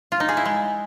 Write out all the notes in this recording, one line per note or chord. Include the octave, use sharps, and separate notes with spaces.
F4
D#4
G#4
E4
G#3